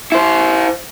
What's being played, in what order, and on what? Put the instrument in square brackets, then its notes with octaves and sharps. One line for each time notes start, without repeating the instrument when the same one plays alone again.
[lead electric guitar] E4 C5